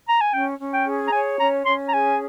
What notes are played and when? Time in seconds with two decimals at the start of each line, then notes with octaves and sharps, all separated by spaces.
0.09 A#5
0.21 G#5
0.33 C#4 G5
0.60 C#4
0.73 G5
0.86 G#4
1.08 A#5
1.12 C#5 G#5
1.40 C#4 A#5
1.66 C#4 C6
1.88 A#5
1.92 G#4 G#5